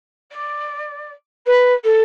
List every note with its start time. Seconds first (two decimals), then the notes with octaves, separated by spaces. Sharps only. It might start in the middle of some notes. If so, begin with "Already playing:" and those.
0.31 D5
1.46 B4
1.84 A4